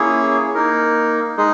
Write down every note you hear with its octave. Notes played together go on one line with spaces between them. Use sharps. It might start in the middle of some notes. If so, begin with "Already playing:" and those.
Already playing: A#3 C#4 E4 G#4 C#5
A#3 D#4 A#4
G#3 D#4 G#4 D#5